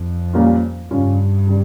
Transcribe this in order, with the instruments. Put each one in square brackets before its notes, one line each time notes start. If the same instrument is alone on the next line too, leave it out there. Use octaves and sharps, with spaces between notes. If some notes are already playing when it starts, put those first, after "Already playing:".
Already playing: [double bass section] F2
[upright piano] A#2 G3 A#3 C#4 F4
[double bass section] G2 [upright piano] C#3 G3 C#4 F4
[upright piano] C#3 G3